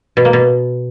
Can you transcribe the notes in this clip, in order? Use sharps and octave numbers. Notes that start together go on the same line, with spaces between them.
B2
A#3
B2